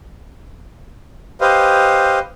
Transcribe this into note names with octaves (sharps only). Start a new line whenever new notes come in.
G4 B4 C5 D#5 F5